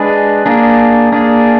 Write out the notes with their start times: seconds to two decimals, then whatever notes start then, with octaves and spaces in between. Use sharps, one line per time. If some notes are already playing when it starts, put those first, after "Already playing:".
Already playing: G#3 D4 G#4 B4
0.46 A#3 D4 G#4
1.12 A#3 D4 G#4